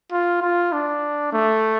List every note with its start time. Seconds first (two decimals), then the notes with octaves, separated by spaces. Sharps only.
0.12 F4
0.42 F4
0.72 D4
1.33 A3